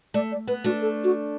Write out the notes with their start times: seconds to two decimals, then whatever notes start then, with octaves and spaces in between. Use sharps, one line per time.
0.14 A3 D5
0.32 D5
0.48 B3 B4
0.64 A3 D4 F#4
0.82 A4
1.04 F#4